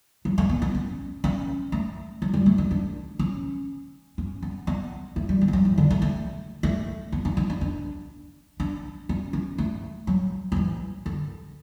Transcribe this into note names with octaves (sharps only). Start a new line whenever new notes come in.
F#3
A3
B3
B3
C#4
C#4
A3
F#3
G3
A3
C#4
D4
C#4
C#4
B3
B3
A3
G3
G3
E3
F#3
E3
D3
A3
A3
A3
B3
D4
B3
D4
D4
D4
C#4
C#4
A3
F#3
F#3
E3
D3